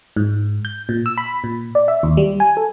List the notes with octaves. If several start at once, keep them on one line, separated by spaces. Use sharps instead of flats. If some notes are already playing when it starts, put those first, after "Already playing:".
G#2
G6
A#2
E6
B5
A#2
D5
E5
D#2
G3
G#5
A4